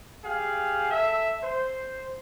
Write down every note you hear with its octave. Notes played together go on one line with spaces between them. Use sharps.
G4 G#4 F5
A4 E5
C5